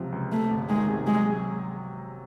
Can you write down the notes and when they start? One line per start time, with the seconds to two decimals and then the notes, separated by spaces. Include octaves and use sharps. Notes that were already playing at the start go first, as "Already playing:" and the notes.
Already playing: C#2 C3 F3 F#3
0.12 C#2
0.32 C3 A3
0.51 G1
0.69 D#3 G#3
0.88 C3
1.07 F#3 G#3